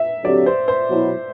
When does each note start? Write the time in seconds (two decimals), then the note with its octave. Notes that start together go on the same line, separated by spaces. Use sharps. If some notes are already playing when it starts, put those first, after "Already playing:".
Already playing: E5
0.24 D3 F#3 C4 G4 D5
0.46 C5
0.68 C5
0.90 B2 F#3 B3 E4